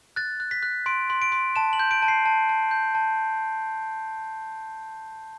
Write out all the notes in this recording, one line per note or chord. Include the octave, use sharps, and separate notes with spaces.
F#6 A6
F#6
B6
F#6
C6 D7
C6
D7
C6
A5 E7
F#7
G6
D7
A5
C7
A5
A5
G6
A5